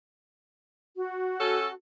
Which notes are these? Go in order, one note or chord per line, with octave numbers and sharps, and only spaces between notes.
F#4
C#4 A4